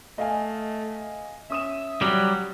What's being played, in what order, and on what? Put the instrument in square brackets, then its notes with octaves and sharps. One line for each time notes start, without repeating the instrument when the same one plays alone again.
[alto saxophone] A3 [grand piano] D#5 F5 G#5
[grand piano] C#4 D#6 E7 [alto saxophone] E5
[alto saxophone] F#3 [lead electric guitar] G3